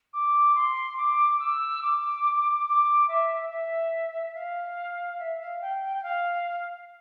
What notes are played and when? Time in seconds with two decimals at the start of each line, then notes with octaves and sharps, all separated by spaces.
0.13 D6
0.55 C6
0.97 D6
1.39 E6
1.81 D6
2.66 D6
3.08 E5
3.50 E5
4.34 F5
5.18 E5
5.40 F5
5.61 G5
5.81 G5
5.98 G5
6.03 F5